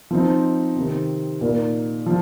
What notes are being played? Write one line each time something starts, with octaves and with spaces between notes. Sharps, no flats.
F3 C4 D#4
C3 D#3 C4
A#2 A#3 D#4
F3